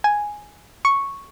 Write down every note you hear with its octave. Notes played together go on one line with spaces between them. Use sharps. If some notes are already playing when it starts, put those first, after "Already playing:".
G#5
C#6